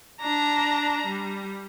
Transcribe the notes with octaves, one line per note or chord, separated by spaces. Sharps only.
D4 A#5
G3